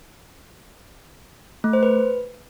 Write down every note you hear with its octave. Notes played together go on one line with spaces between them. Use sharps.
A3
C5
B4